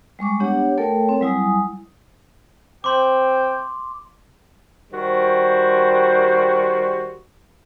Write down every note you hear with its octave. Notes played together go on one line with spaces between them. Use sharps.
G3 G#3 C#6 D6
B3 D4 G4 C#5 F#5
A3 A4 A#4 C#5 G5
C4
F#3 G3 E4 G#5 D#6
C4 C5 G5 C6 D6
D#3 G3 F#4 C5